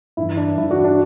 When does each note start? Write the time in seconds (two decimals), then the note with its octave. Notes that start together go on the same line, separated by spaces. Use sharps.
0.17 G2 E3 E4
0.37 D4
0.57 G2 E3 E4
0.71 D4 F#4
0.84 D4